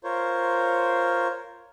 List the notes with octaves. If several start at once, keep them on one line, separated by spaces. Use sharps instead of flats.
F4 A#4 C5 C#5